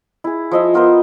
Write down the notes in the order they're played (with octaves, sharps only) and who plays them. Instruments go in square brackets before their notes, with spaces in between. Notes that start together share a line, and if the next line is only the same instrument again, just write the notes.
[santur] E4 G#4
F3 D#5 E5
B3 F4 A#4 C5